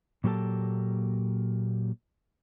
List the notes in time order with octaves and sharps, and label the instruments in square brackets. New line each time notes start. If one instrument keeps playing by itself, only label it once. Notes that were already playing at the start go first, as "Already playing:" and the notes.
[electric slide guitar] A#2 F#3 A#3 G4 A4 A5